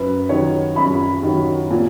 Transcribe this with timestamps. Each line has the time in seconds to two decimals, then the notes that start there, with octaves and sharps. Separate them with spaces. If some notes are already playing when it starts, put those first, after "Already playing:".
Already playing: F#2 B4
0.29 D#3 F#3 C#5
0.76 F#2 B5
1.23 D#3 F#3
1.71 A#2